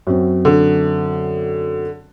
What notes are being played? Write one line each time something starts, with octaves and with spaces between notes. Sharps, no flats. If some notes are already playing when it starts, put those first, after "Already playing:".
F#2 F#3 C4
D3